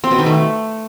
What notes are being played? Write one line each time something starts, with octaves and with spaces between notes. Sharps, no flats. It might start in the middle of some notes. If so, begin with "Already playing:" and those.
C4
B2
D#3
A3